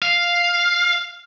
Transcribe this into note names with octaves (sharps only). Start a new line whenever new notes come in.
F5